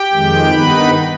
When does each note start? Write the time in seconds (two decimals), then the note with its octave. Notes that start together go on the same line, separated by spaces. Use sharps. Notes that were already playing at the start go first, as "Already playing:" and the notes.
Already playing: G4 G5
0.13 F2 D#3 G#3
0.51 G2 D#3 B3 D#4 B4 B5